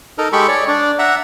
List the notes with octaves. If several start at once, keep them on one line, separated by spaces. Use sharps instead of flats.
D#4 A4 A#4
G#3 G4 A4 B5 C#6
C#5 D5
D4 D5
E5 F#5 A#5